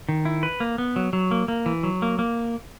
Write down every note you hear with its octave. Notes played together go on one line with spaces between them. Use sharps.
D#3
E4
B4
A#3
B3
F#3
F#3
A#3
A#3
E3
F#3
A#3
A#3